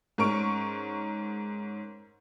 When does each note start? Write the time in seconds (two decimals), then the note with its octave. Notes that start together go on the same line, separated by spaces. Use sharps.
0.18 G#2 C#4 A#4 C#6 D7